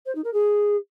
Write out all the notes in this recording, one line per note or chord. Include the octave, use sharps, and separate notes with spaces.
C5
D#4
A#4
G#4